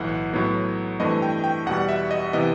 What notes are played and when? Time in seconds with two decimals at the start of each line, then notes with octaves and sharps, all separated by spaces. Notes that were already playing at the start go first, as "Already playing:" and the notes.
Already playing: B1 A2 E3 F#5
0.33 A2 F#3 B3 D#4
1.00 G2 E3 A3 C4 D#5
1.22 G5
1.44 G5
1.66 E2 B2 G3 F#5
1.89 E5
2.11 D#5
2.33 C3 E3 B3 D#5